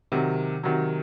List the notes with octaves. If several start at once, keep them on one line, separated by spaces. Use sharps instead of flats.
C3 D#3 F#3
C3 D#3 F#3